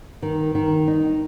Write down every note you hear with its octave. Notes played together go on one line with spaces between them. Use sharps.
D#3
D#3
D#4